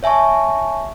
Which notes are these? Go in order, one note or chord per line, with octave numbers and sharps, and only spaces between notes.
C#5 E5 G#5 A5 C#6